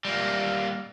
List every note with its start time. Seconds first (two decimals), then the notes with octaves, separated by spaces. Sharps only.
0.05 G3 A#3